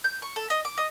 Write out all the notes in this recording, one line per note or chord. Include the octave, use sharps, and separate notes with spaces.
G6
C#6
A4
D#5
D6
D#5